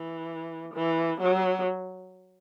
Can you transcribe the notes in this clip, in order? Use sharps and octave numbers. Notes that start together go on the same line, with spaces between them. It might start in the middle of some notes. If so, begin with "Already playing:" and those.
Already playing: E3
E3
F#3